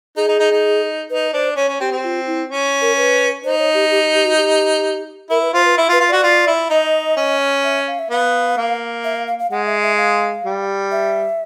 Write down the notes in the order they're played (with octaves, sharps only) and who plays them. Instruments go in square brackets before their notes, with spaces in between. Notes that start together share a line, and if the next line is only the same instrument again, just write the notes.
[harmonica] D#4 [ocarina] G#4
[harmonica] D#4
D#4
D#4
[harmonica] D#4 [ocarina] B4
[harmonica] D4 [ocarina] C5
[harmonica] C#4 [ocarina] C#5
[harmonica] C#4
[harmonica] C4 [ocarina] G4
[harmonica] C4
[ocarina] F4
E4
[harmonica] C#4
[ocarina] A#4
B4
[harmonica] D#4 [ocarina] C5
[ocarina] C#5
G4
G4
G4
F#4
G4
[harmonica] E4 [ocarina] A#4
[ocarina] B4
[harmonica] F4 [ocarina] C5
[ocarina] B4
[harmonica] E4
F4
[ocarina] B4
[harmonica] F4
[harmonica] F#4 [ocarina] D5
[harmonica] F4
E4
[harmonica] D#4 [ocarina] D#5
[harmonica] C#4
[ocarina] E5
F5
E5
[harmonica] B3 [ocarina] F5
[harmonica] A#3
[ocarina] E5
F5
F5
F5
[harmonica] G#3 [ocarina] F#5
[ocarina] E5
E5
F5
[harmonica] G3
[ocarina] E5